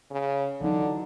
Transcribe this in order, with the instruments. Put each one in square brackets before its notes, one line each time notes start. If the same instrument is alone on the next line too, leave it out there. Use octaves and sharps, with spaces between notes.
[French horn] C#3
[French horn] D3 [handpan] E3 F#3 D#4